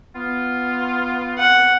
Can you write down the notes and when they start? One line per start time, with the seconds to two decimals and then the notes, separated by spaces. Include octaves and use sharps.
0.16 B3 F4
1.39 F#5